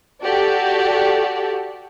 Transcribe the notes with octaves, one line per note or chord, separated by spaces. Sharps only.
F#4 G4 A4 D5